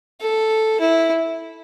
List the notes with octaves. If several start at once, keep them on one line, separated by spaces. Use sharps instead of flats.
A4
E4